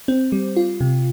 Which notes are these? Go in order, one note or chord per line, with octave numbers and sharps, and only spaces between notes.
C4
G3
F4
C3